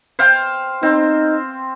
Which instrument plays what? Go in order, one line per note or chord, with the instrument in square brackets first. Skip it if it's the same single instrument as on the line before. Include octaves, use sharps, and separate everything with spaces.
[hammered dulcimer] C5 F5 G5
[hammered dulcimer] C4 [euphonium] D#4